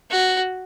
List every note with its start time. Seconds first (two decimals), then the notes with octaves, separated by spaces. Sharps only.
0.10 F#4